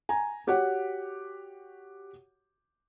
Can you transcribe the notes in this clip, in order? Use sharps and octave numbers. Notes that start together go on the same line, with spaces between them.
G#5 A#5
F#4 G4 C#5 F#5